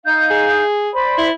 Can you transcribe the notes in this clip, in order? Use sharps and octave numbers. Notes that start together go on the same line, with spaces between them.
D#4 F5 G6
G#4
C5 D5 B5
E4